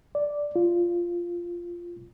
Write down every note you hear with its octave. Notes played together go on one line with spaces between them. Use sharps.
D5
F4